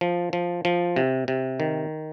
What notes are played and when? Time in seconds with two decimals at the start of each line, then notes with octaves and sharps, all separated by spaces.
0.01 F3
0.33 F3
0.65 F3
0.96 C3
1.28 C3
1.60 D#3